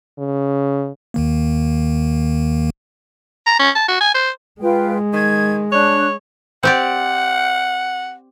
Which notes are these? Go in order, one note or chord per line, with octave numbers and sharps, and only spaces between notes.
C#3
D#2 D#3 A#3
A#5
C#4
A5
F#4
G#5
C5
G#3 F4 B4 G5
D#3 G#6
D4 C#5 F#6
C4 G4 D5 F#5